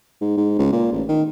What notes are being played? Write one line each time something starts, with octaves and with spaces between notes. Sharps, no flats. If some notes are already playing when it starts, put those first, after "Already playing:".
G#2
G#2
C#2
A#2
A1
D#3